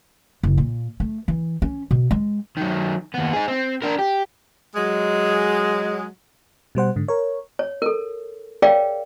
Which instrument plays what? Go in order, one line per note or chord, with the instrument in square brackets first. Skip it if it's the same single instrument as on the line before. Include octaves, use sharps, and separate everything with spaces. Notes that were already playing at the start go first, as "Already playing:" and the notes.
[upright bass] F#1
A#2
A3
E3
C#4
B2
G#3
[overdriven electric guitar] D#3 F#3
D#2 B3
D#4 G#4
C4
D4 A#4
G4
[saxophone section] F#3 G#3
[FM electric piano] B2 G3 C5 F#5
G#2 D3
A#4 C#5
[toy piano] C#5
A4 A#4
G#4 A#4 C#5 D5 F5 G5